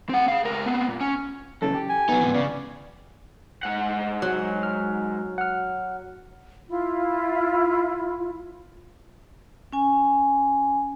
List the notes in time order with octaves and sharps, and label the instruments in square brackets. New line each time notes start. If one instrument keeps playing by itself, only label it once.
[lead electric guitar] C4 F#5
G#4 F5
C#2 A#4
B3 C4
A#2
C#4
[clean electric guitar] F#2 C#3 E3 [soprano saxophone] A4
[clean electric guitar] G4
[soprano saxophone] G#5
[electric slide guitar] F#3 D#4 [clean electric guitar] B3
[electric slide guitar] G#2 C3 E3
[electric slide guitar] C#3 [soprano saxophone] D5
[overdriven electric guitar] G#2 F#5
[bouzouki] F#3
[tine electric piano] F6
F#5 F6
[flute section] E4 F4
[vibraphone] C#4 G#5